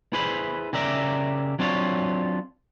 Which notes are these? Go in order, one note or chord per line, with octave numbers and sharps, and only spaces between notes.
E4 G#4 B4 C5 B5
C#3 G4 A#4 D5 E5 A#5
F#3 C4 D4 F4 C#5